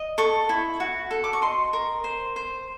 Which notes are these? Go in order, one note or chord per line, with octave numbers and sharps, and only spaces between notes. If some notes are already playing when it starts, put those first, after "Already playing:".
Already playing: D#5
A4 C#6
E4
F#4
A4
D6
C#6
D#5 C6
A#4
C5
C5